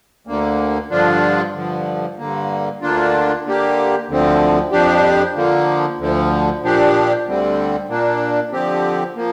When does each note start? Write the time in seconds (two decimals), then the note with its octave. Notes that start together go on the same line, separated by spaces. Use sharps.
0.27 D2 D3 A#3
0.91 G2 D3 F3 D4 F4
1.54 G2 D3 F3
2.18 G2 D3 A#3
2.82 D2 D3 A#3 D4 F4
3.44 D3 A#3 G4
4.08 D2 D3 F3 C4
4.72 F2 F3 D4 G4
5.35 D3 F3 A#3
5.98 D2 D3 F3
6.62 A#2 F3 D4 G4
7.25 D2 D3 G3 C4
7.89 A#2 A#3 D4
8.52 D3 F3 C4 G4
9.16 F3 A#3